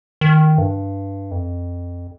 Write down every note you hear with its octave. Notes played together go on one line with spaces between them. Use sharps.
D#3
G2
F2